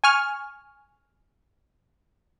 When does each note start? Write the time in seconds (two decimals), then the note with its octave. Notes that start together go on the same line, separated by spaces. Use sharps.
0.04 G#5 C#6 F6